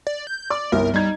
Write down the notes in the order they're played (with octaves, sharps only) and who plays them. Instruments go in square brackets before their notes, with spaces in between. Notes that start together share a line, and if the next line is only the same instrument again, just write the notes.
[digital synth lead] D5
G6
[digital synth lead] D5 [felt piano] D6
[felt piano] G1 C2 [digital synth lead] A#4
[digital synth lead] G3 [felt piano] D#4 G#6